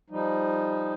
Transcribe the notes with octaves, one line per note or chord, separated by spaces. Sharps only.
F3 G3 D#4